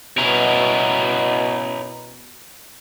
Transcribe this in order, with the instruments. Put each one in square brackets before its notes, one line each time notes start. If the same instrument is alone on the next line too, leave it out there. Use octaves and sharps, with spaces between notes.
[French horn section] B2 [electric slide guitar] C#4 E4 A#4